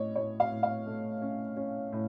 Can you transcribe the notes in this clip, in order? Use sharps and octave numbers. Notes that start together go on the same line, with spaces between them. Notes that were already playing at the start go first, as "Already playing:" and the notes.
Already playing: A2 C#4 C#5 D#5
A2 C#5
F5
A2
F5
A3
C#4
C#4
A2